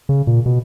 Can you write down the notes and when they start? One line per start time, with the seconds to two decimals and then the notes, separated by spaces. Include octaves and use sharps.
0.09 C#3
0.27 A#2
0.46 B2